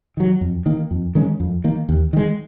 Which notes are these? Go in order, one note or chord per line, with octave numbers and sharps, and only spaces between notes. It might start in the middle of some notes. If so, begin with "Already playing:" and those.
D#3 F#3
F2
D#3 A#3
F2
D#3 G#3 C#4
F2
D#3 A#3
D#2
D#3 G#3